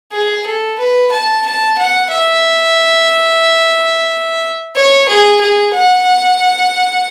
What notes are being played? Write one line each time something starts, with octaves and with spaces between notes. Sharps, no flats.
G#4
A4
B4
A5
A5
F#5
E5
C#5
G#4
G#4
F#5